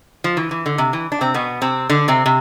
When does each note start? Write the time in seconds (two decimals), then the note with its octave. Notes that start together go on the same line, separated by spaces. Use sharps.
0.24 F3
0.37 E3
0.51 E3
0.66 D3
0.78 C3
0.93 E3
1.12 D4
1.21 C3 C4
1.34 B2 B3
1.62 C3 C4
1.89 D3 D4
2.08 C3 C4
2.26 C3